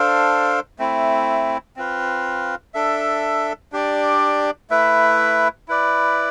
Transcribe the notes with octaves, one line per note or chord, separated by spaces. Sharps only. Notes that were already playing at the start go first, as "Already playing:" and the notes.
Already playing: D4 A4 C5 F5
A3 C4 E4
C4 F4 B4 F5
D4 A4 E5
D4 G4 D5
A3 E4 B4 E5
E4 B4 D5